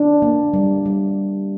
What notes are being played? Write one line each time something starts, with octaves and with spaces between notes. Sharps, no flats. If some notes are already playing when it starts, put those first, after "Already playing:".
Already playing: D4
A#3
G3
G3